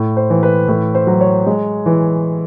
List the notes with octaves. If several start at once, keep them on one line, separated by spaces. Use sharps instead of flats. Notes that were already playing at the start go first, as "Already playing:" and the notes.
Already playing: A2
C5
E3
B4
A2 B4
C5
F#3
C#5
G#3
E3